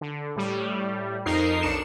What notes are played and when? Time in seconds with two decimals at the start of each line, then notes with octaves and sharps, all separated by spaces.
0.01 D3
0.36 A2 G3
1.26 F2 D#4 A#4 C7
1.63 B1 D4 C#7 E7